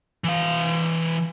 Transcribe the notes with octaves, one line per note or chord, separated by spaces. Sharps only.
E3 F5